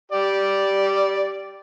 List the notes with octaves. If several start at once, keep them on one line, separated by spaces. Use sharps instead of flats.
G4 D5